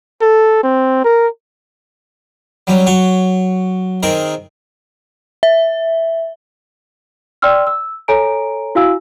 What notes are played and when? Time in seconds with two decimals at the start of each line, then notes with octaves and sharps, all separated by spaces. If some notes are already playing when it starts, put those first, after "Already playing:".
0.21 A4
0.63 C4
1.04 A#4
2.67 F#3 G3 C#4
2.87 F#3 C#5
4.03 D#3 C4 G#4 A#4
5.43 E5
7.42 D5 G5 C6 E6 F6
7.67 E6
8.08 A4 C#5 G#5 A#5 D7
8.75 E4 F#4 F5 G#5 E6